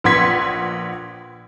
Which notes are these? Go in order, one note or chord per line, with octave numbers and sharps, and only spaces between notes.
A#1 B4 F#5 C6 G#6 B6